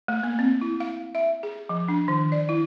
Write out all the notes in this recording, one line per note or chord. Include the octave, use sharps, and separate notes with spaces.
A3
A#3
C4
E4
F5
E5
G#4
F3
D4
D#3
D5
E4